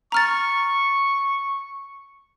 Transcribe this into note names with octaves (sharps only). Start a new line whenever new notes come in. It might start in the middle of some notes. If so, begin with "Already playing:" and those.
A#5 C#6 F6 A6